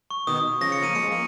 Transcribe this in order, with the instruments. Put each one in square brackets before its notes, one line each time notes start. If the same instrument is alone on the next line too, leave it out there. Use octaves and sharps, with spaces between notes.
[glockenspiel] C#6
[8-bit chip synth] B2 D#3 [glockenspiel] D#6
[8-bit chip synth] C#3 F3 [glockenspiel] A#6
[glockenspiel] C#7
[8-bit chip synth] A#3 [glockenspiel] D#7
[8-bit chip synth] F3 G#3 [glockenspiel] C#7
[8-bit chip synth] A#3